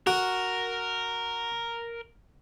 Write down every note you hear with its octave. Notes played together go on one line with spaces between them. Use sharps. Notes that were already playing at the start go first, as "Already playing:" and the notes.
F#4 A#4